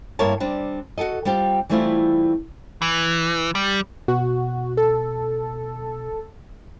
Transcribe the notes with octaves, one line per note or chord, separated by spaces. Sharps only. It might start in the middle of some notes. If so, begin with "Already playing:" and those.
G2 A#3 E4 A#4 C#5 A5
G3 C4 D4
F#4 G4 A4 D#5
G3 C4 F4 G4
E3 G3 A3 C4 E4 F4
E3
G3
B2 F#4
A4